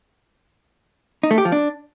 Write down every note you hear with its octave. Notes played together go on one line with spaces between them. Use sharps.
D#4
A3
G4
F3
D4